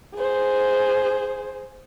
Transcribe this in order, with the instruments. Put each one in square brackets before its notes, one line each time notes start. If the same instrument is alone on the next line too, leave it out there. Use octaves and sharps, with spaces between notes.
[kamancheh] G#4 C5